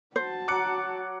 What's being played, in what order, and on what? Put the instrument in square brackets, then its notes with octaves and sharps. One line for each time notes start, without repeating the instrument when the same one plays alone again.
[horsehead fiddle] F#4 A5 [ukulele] C5
[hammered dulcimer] F#3 A#5 [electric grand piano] D6 F#6 C#7